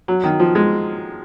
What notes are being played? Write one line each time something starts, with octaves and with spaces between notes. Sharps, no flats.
F#3
D#3
F3
G#3